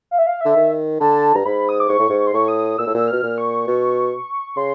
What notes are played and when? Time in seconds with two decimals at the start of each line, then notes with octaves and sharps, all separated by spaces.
0.11 F5
0.18 E5
0.27 F5
0.41 D3 E5
0.56 D#3
1.00 D3 A5
1.35 G2 A#5
1.45 G#2 B5
1.69 D#6
1.80 D6
1.89 G#2 C#6
1.99 A2
2.09 G#2
2.19 C#6
2.27 C6
2.34 A2 C#6
2.48 D#6
2.79 A#2 E6
2.87 A2
2.94 A#2 E6
3.08 B2 F6
3.23 A#2
3.38 C#6
3.67 B2
4.57 C#3 C6